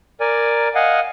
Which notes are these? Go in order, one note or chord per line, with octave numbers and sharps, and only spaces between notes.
A#4 D5 G#5
D#5 F5 F#5 G#5